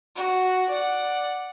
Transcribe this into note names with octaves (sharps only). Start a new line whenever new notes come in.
F#4
D5 F#5